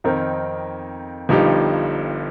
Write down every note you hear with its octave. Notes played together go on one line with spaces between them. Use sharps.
F2 D#3 C4 D#4 A#4
G1 G2 F3 D#4 G4